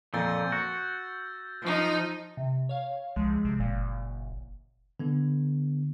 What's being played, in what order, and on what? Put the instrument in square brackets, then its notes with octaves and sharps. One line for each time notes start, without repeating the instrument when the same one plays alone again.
[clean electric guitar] F2 A#2 [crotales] E6 G6 A6
[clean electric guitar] F#4
[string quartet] F3 D#4
[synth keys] C3
C#5 F5
[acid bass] C2 [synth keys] F3 G#3
[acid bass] C3
[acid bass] F#1 [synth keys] A#2
[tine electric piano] D3 B3